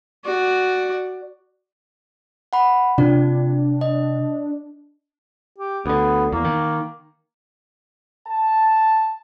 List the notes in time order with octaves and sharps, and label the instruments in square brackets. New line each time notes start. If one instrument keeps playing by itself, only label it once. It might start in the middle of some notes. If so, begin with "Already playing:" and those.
[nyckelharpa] F#4 D5
[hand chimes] F#5 B5
[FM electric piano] C3 [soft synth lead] D4 [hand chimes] F4 D5
[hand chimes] D#5
[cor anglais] G4
[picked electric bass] D2 D3 [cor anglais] B3
[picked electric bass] E2 [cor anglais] A#3
[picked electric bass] D#3
[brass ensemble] A5